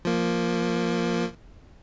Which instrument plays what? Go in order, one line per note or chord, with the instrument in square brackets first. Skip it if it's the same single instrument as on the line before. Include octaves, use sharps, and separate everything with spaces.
[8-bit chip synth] F3 A#3